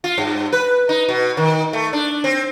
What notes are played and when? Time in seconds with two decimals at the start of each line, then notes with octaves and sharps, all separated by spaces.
0.04 F4
0.18 G2
0.52 B4
0.89 D#4
1.09 B2
1.37 D#3
1.73 A3
1.93 D4
2.24 C4